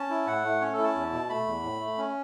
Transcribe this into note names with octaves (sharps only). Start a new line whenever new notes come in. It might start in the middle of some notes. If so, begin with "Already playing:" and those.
Already playing: C#4 A5
E4
A2 F#5
A3
C#4 C#5
A4
E4
A5
E2
B2
A3 B5
E2
A2
A3
C#4